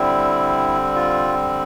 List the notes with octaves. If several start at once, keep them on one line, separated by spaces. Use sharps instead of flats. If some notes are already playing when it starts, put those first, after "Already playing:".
Already playing: D3 G3 C4 E4
F4